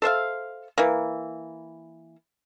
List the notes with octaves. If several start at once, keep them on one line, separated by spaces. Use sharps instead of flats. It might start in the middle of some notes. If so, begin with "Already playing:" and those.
A4 C5 E5 F5
E3 A#3